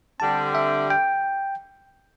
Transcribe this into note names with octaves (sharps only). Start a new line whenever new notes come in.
D3 G3 C4 A5
E5
G5